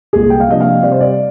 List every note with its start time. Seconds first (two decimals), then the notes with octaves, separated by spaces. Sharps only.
0.13 C2 A#2 G#3 G#4
0.30 G5
0.40 F5
0.48 C3 F3 A#3 D4 D#5
0.60 F5
0.83 C3 G3 C4 D5
0.92 C5
1.01 D5